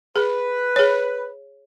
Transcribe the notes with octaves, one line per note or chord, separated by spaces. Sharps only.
G#4 B4
G#4 C#5